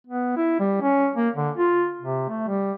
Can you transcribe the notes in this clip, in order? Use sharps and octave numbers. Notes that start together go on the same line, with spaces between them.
B3
E4
G3
C#4
A#3
D3
F4
C3
A3
G3